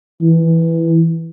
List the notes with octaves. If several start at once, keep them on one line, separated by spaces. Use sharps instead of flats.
E3